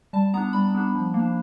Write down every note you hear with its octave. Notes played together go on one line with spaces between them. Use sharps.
G3 A5
B3 D4 A#5
G3 B5
B3 D4
F3
A#3
D4